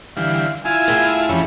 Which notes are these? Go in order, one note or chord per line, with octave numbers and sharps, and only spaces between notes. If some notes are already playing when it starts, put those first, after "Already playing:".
D3 E3 G3 F5
E4 F4 G#5
A2 G#4
F2 E3 G3 C#4